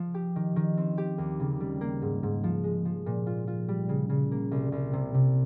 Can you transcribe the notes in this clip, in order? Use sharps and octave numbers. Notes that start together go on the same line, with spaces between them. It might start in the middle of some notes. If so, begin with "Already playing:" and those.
Already playing: F3
G4
D#3
D#3
C4
G4
D#2
C#3
G3
A#3
G#2
G#2
F3
G#3
F3
A#2
F4
F4
G3
C#3
C#3
A#3
C2
C2
C3
C3